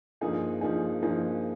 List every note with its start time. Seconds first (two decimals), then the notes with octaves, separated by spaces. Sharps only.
0.21 G2 F3 A#3 D#4 G#4
0.61 G2 F3 A#3 D#4 G#4
1.02 G2 F3 A#3 D#4 G#4